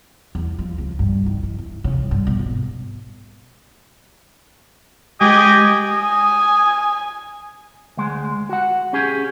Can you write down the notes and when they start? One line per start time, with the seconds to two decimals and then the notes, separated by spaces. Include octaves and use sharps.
0.35 E2
0.59 F3
0.78 C#2
0.99 G2
1.26 D#3
1.43 E3
1.59 E3
1.84 C#3
1.98 G2
2.11 G2
2.27 B2
2.39 G#1
5.21 G#3 G4 D#5 G#5
5.91 G#5 D#6
7.97 D2 G#3
8.49 F#4 F#5
8.93 C#4 G4 G#4